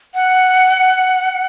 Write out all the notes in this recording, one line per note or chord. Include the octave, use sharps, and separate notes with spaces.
F#5